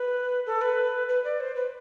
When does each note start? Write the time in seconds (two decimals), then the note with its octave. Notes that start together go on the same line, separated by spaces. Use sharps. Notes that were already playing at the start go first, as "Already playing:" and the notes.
Already playing: B4
0.46 A4
0.61 B4
1.09 B4
1.24 D5
1.40 C5
1.56 B4